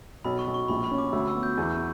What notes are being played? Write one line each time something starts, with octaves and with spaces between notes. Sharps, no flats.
B1 B5
C#6
B1
C#6
A#1 B5
B5
C#4
D6
D2 E6
E6
B3
G6
E2